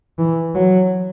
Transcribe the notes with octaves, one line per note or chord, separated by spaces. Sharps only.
E3
F#3